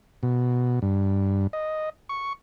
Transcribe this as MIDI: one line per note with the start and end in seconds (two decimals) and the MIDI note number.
0.23 0.79 47
0.82 1.47 43
1.53 1.89 75
2.09 2.33 85